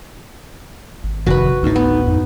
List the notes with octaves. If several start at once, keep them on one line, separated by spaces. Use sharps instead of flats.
G#1
F1 D#3 F#4 B4
D2 A2 D#4
B3
F2 D#4